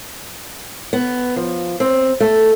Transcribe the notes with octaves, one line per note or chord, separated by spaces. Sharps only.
B3
F3
C4
A3